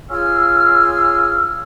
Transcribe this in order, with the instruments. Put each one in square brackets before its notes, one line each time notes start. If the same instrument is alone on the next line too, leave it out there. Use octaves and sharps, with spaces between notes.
[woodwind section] C#4 F4 G#4 E6 F6